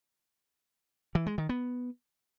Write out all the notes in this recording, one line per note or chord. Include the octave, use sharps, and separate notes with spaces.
E3
G#3
D#3
B3